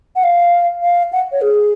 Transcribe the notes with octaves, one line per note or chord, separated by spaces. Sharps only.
F#5
F5
F5
F#5
C#5
G#4